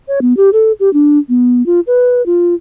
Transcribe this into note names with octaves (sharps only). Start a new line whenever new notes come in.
C#5
B3
G4
A4
G4
D4
B3
F4
B4
F4